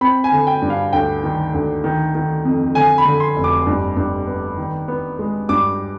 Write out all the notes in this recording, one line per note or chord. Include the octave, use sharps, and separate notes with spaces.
C4 B5
G#5
D3
G5
G2
F5
D2 G5
D#3
D2
D#3
D#3
F2
D3 G#5
B5
D3
C6
F1
D6
G2
G2
B3
D#3
B3
G#3
G2 D6